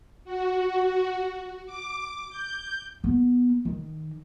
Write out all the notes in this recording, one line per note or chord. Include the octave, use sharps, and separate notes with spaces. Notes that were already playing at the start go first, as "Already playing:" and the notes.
F#4
D6
G6
B3
D#3